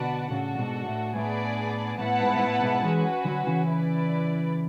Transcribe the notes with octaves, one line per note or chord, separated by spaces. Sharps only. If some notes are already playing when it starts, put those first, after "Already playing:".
Already playing: B2 D3 F#4 B4 D5 F#5 A5
A2 C#3 D4 F#4 A4
G#2 B2
A2
A2 B3 D4 G#4 B4 D5
A2 B3 E4 B4 F#5 A5
G#2
G#2
A2
G#2 B2
E3 G#3 C#4 F#4 B4
D3 F#3
C#3 E3
E4 B4 D5